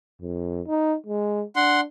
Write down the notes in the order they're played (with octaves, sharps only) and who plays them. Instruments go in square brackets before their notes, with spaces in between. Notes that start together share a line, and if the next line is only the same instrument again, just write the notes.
[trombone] F2
D#4
G#3
[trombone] D4 [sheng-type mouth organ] F#5 C6